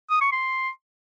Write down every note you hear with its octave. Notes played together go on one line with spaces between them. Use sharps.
D#6
C#6
C6